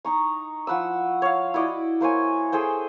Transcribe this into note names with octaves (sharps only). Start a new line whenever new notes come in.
D#4 A#5 C#6
F3 F#5 B5 E6
C#5 F5
E4 F#4 D5 D#5
A#3 C5 C#5 G#5
G#4 A4 C5 G5